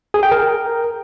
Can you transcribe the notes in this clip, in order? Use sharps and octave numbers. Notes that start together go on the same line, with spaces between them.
G#4
G5
A#4